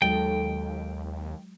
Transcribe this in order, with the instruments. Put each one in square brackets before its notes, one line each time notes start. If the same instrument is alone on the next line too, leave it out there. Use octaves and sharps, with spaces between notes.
[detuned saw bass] D#2 [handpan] F#3 G#3 [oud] D#4 A4 [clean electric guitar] G5